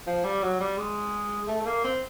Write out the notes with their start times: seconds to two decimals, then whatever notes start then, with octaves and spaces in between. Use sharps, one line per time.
0.07 F3
0.24 G3
0.43 F#3
0.60 G3
0.78 G#3
1.48 A3
1.62 A3
1.66 A#3
1.84 C4